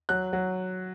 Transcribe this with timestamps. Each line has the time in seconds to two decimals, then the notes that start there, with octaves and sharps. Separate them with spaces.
0.09 F#3 F#6
0.33 F#3